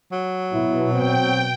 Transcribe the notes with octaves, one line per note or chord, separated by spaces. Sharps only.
F#3
B2 E4
C4 G5